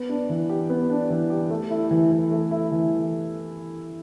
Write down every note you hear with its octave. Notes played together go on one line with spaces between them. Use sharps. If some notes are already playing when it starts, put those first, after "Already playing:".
Already playing: B3
D4
E3
G4
B3
D4
E3
G4
A3
E4
E3
E3
A3
E4
E3